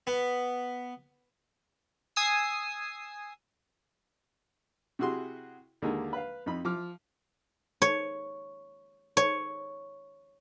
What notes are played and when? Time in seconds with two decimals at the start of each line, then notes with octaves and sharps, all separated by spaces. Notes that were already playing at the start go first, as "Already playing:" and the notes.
0.07 B3
2.16 G#5 D#6 E6 C7
4.99 C3 E4 F#4 G#4 C6
5.82 D#2 D3 G#3 A#3 D#4
6.13 B4 F5
6.46 F2 D#4 B5
6.65 F3 D6 F6
7.82 C#5
9.17 C#5